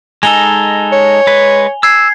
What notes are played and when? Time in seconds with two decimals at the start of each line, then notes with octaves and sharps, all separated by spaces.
0.23 G#3 D#4 A4 G#5 F7 G7
0.92 C#5
1.27 G#3 B4
1.83 E6 G#6 C7